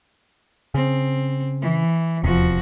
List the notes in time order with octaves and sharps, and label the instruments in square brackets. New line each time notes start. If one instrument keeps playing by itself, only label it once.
[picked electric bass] C#3 [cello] C4
[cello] E3
[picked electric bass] D#1 E2 C3 [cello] F3 F#4